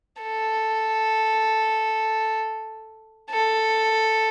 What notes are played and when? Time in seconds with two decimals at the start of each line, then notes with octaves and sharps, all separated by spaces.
0.22 A4
3.30 A4